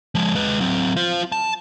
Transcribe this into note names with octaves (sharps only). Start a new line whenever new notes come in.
F3 G#3
G#3 B4
F#3 C4
F4 C5
A5